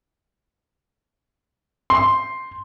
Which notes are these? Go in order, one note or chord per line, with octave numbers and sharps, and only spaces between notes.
C6